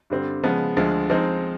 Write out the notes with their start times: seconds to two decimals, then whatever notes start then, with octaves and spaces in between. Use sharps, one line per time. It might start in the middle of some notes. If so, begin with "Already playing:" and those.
0.10 G2 D3 G3 C4
0.43 C#3 F3 G#3 B3
0.77 D2 D3 F3 G#3
1.10 F3 G#3 C4 D#4